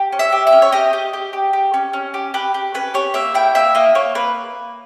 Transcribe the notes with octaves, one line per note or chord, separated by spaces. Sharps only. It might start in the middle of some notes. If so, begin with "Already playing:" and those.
Already playing: G4
C#4
E5
G4
E5
C#4
C#5
G4 D#5
G4
G4
G4
G4
C#4
C#4
G4
G4 B4
G4
C#4 B4
G4 C#5
A#3 E5
E4 G5
A#3 E5
A#3 D#5
A#3 C#5
A#3 B4